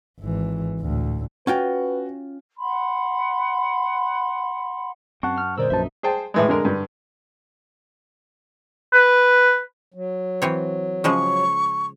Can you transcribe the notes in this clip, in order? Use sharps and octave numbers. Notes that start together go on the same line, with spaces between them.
G#1 E3
D2 A2
C#4 F4 F#4 B4 G5
F#5 B5 C6
F#2 C4 F#5 A5 C#6
F6
A#2 D3 G#3 A#4 C5 D5 E6
A#1 F#2 D#4 B4 D#5 E5 A5
G#4 C5 G5 A5
A2 E3 G#3
D3 G#3 A#4
G2 D3
B4
F#3
E3 C4 C#5
C#3 F3 G#3 C#6